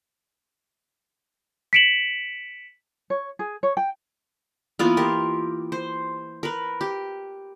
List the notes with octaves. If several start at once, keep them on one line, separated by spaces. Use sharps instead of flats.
B6 C#7 D7 E7 F#7
C#5
G#4
C#5
G5
E3 A#3 B3 F4
G4 A#4
C5
A#4 B4
G4